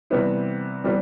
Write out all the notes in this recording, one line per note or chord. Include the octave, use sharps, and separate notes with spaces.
C3 E3 G3 B3 E4
C3 E3 G3 B3